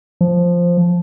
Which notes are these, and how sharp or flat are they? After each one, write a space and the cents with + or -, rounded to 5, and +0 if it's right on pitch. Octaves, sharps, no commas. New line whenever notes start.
F3 +0